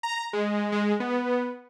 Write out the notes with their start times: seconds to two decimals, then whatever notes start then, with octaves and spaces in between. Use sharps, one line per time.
0.03 A#5
0.33 G#3
0.72 G#3
1.00 B3